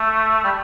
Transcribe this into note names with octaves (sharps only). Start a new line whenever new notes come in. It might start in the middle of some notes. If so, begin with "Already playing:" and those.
Already playing: A3
G3